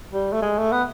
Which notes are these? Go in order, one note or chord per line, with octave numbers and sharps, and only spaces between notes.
G3
A3
G#3
A3
B3